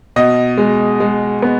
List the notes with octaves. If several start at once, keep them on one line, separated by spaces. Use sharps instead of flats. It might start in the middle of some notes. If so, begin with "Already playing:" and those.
B2 D#5
G#3
G#3
B3